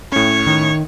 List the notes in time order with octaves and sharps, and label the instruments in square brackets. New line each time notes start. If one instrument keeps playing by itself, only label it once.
[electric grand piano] A2 C#4 [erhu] C#5
[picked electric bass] D#3